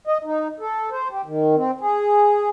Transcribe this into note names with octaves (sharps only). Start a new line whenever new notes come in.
D#5
D#4
A4
C5
G4
D#3
C4
G#4